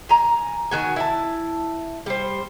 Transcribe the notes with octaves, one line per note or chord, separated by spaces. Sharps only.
G#5 A#5
D#3 F#4 G#5
E4 A5
G3 C5